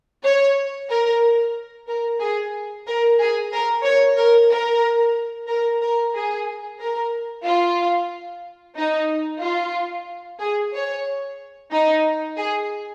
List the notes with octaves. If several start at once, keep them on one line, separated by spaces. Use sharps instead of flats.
C#5
A#4
A#4
G#4
A#4
G#4
A#4
C#5
A#4
A#4
A#4
A#4
G#4
A#4
F4
D#4
F4
G#4
C#5
D#4
G#4